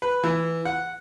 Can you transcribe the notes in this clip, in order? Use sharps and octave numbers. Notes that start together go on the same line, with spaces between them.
B4
E3
F#5